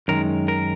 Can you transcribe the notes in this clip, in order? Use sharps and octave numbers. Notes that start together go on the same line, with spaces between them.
F#2 D#3 G#3 A#4
A#4